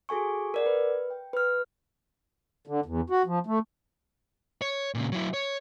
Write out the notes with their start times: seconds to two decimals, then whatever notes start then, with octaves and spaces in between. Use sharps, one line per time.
0.09 F#4 G#4 A4 G#5 C#6
0.54 A#4 D5 F#5
0.66 B4
1.10 G5
1.33 B4 F6
2.67 D3
2.86 E2
3.10 F#4
3.26 F3
3.47 A3
4.62 C#5
4.95 A#2 C#3
5.12 F#3 E4
5.34 C#5